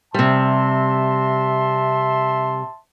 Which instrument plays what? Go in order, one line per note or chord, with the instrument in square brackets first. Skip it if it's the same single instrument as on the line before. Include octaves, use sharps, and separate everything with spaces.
[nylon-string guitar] C3 G3 [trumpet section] E5 A5 C6